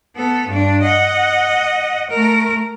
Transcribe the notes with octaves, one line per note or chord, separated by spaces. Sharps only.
B3 A4
G2 D4
D#5 F#5
A3 A#4